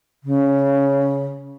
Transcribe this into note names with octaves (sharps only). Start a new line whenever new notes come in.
C#3